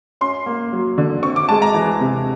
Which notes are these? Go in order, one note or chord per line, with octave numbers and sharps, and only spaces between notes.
C#4 C6
A#3
F#3
D3
C4 C#6
D6
G#3 A5
A#5
E3
C3